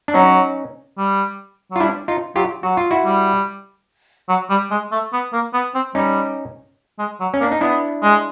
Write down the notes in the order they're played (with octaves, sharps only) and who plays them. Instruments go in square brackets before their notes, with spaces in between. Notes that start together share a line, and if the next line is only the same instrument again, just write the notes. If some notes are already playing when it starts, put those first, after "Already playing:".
[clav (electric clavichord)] D4
[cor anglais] F#3 [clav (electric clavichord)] C#4 D#4
[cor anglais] G3
F#3
[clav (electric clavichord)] F4
[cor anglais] G3 [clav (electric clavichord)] D4 E4
[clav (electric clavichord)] D#4 F4
[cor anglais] F#3 [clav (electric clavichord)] F4 G4
[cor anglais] F#3 [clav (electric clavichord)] F#4
[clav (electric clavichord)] F4
E4 F#4
[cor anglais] G3
F#3
G3
G#3
A3
B3
A#3
B3
C4
[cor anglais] G3 [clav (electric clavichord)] C#4 D#4
[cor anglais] G#3
F#3
[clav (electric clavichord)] C#4
[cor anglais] A#3
[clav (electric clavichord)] D4
D#4
[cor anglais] B3 [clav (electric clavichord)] D4 E4
[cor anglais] G#3